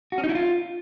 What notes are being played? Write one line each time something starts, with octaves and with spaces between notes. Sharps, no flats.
F#4
C#4
D#4
E4
F4